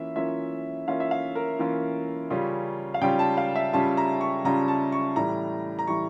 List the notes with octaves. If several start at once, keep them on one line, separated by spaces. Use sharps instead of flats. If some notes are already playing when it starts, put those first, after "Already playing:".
Already playing: E3 A#3 C#4 F4 E5
E3 A#3 C#4 F4 E5
E3 A#3 C#4 F4 F5
E5
F5
A#4
E3 A#3 C#4 F4
C#3 G3 C#4 F4
F5
C#3 G3 C#4 F4 G5
A5
F5
E5
C#3 G3 C#4 F4 A5
A#5
C#6
C#3 G3 C#4 F4 A#5
A5
C#6
A2 E3 G3 A#5
A#5
A2 E3 G3 C#6